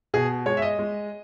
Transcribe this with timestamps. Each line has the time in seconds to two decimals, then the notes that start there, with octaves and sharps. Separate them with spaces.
0.14 B2 G#4
0.46 G#3 C#5
0.57 E5
0.62 D#5
0.79 G#3